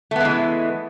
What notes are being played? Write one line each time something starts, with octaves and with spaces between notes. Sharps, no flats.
E3 G#3 A3 B3